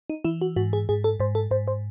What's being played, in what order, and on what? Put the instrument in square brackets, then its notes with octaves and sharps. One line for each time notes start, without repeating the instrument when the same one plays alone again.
[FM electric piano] D#4
E3 E4
F#4
G#2 F#4
G#4
G#2 G#4
A4
G#2 C5
A4
G#2 C5
C5